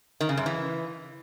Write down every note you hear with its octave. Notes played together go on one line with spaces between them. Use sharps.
D#3
C#3
F#2
E3